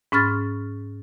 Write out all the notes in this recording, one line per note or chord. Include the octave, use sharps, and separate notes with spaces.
G#2 C#4 B5 F6 A6